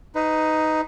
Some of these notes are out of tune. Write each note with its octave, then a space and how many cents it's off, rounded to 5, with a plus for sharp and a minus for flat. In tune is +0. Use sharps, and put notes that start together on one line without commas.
D#4 +5 B4 +25